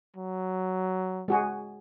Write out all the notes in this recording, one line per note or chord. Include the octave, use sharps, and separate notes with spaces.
F#3
G#3 F#4 G#4